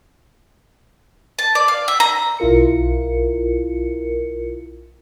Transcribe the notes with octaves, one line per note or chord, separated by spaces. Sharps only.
A5
D5
F5
E5
A#5
B1 E4 F4 A#4 C#7